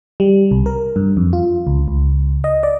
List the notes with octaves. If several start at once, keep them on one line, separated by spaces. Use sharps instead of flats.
G3
C2
A#4
G2
F2
F4
C#2
C#2
D#5
D5